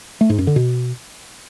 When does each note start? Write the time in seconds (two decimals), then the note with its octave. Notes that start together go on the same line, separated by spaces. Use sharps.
0.21 A3
0.30 G#2
0.38 F#2
0.47 D3
0.56 B2